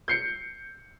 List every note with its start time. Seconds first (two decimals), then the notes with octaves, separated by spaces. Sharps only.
0.08 G6 C7 C#7